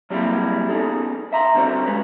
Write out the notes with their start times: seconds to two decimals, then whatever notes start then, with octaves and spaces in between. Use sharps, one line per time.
0.10 F#3 G3 A#3 C4 E4 G#4
0.69 B3 C#4 D#4 G#4 A4
1.33 E5 A#5 C6
1.55 D3 G3 C4 F#4 C5 C#5
1.86 G#3 C#4 B4